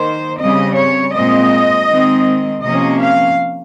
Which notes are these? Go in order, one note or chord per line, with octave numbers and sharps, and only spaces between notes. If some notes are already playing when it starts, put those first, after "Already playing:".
Already playing: D#3 A#3 C5
C#3 G3 C4 D#5
C#5
A#2 G#3 C4 D#5
D#3 G#3 C4
C3 F3 A#3 C#4 D#5
F5